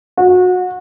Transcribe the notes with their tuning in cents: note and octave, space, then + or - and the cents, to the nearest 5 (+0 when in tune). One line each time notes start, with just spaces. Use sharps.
F#4 -25